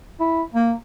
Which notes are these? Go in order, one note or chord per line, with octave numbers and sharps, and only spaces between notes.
E4
A#3